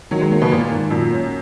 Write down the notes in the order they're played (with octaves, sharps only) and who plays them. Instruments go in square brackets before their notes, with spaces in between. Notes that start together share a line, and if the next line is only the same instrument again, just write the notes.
[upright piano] D#3 [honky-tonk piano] F#3
[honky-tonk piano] G#3
[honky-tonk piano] F#3 [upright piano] A#3
[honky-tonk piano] B2
[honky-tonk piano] A#2 [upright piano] A#3
[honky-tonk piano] G#2 [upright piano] D#3
[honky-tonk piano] F#2 [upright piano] A#2
[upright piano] C#4